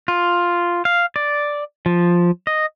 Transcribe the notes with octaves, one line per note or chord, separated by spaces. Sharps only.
F4
F5
D5
F3
D#5